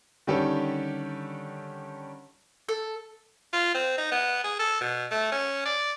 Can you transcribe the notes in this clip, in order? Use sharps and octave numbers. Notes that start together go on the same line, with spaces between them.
D3 D#3 G3 C#4 G4 A4
A4
F4
C4
D#4
B3
G#4
A4
B2
A3
C#4
D5